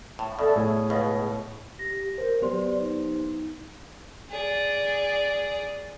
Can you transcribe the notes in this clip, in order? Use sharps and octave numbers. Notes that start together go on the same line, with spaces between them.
A2
B2 A4 D5 E5
A2 G#4
C#2 B2
G4 A#6
A#4 C5
F#3 B3 G4 C5 D5 C6
D#4
G#4 D5